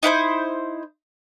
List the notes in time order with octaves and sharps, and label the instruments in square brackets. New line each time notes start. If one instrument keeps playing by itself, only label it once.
[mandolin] D#4 E4 B4 C5